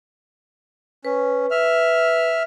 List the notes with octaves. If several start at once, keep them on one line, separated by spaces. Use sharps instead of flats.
C#4 B4
E5 F6